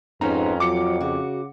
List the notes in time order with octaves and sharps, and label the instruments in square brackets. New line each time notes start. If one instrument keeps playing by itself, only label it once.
[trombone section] F2 [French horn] G#2 [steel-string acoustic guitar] B3 D#4 C5 [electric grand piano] C#4 A#5
[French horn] F#3 [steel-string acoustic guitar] F4 [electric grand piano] D6 C#7
[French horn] C#3 [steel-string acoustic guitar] F#4